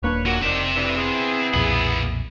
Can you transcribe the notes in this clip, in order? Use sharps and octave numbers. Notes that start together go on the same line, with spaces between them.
D#1 A#3 D4 B4 C#5
F#2 A#2 F#3
F1 D#3 C4 D4 E5
D2 G2 E3
B3 E4 G#4
B1 F2 A#2 A#3 B5